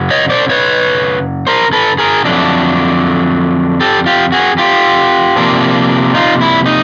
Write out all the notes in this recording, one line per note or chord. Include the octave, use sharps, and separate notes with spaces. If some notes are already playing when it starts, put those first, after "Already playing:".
Already playing: F#2 C#3 F#3
C#5 D#5
C5 D5
B4 C#5
A#4 C5
A4 B4
G#4 A#4
F2 D3 F#3 A3 D4
G4 A4
F4 G4
F#4 G#4
F4 G4
C3 F3 A#3 D4
D#4 F4
E4
D#4